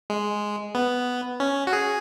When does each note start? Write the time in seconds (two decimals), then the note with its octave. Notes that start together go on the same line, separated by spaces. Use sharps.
0.10 G#3
0.75 B3
1.40 C#4
1.67 F#4
1.73 G#4